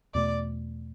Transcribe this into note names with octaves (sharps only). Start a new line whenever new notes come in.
E2 B2 A3 D5